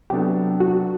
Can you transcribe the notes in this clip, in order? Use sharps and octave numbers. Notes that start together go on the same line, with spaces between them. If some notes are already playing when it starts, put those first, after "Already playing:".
C3 F#3 B3 D4 G4 A4
F#4